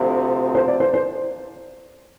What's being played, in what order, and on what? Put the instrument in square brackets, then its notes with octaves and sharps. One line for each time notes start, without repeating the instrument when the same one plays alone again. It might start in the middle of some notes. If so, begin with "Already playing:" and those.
Already playing: [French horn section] D2 C3 F3
[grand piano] C5
D5
C5
C5